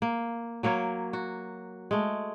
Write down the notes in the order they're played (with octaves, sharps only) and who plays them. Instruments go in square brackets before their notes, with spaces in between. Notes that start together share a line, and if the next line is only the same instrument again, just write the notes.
[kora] A#3
F#3 A#3 A#4 C#5
F#4
G#3 A3